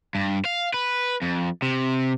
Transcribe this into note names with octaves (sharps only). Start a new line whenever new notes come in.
G2
F5
B4
F2
C3